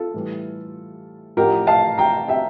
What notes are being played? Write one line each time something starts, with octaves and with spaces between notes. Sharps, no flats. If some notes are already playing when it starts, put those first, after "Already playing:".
Already playing: F4 A4
A2 E3 G3
A1 A2 F3 G4 A#4
F5 A5
G5 A#5
E5 G5